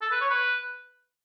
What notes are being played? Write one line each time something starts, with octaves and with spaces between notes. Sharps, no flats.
A4
B4
C#5
B4